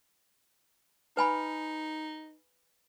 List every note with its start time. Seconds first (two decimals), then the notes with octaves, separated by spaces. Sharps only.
1.17 D#4 B4 G#5 B5